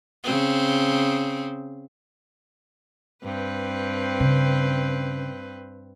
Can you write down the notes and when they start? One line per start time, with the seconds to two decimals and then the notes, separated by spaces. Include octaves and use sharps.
0.24 C#3 C4
3.23 G2 C4 B4
4.20 C#3